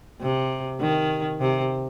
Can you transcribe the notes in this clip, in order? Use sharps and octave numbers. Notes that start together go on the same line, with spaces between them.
C3
D#3
C3